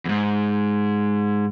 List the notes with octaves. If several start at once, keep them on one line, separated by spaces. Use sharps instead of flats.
E2 G#2